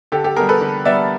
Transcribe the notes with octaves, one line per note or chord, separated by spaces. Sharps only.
D3 G4 A4
G4 A4
G3 B3 G#4 A#4
A4 B4
D3
G3 B3 D5 E5